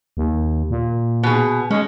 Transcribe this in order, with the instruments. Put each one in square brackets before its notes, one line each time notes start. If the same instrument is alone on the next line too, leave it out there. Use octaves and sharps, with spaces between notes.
[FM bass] D#2
A#2
[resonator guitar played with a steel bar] B2 G#4
[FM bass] G#3 [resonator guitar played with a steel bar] C#4